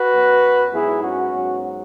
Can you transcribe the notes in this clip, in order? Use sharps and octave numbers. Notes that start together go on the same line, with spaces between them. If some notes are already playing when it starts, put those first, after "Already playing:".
Already playing: F#4 B4
F#2 F#3 B3
G#2 F#3 B3 E4 G#4
C#4 F#4
G#2 F#3 B3